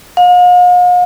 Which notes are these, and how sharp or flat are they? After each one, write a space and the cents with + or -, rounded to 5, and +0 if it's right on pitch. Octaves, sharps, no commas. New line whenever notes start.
F5 +45